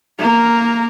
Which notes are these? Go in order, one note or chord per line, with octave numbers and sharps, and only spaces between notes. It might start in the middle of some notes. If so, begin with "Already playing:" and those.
A#3 A#4